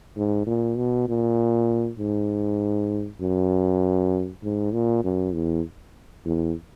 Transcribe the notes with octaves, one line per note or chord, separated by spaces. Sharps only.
G#2
A#2
B2
A#2
G#2
F#2
G#2
A#2
F#2
E2
E2